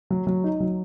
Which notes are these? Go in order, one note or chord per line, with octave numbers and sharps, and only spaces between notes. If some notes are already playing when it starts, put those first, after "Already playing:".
F#3
F#3
D#4
F#3